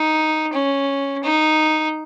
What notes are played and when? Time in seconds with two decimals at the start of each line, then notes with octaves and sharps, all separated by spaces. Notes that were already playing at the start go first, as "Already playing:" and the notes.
Already playing: D#4
0.54 C#4
1.23 D#4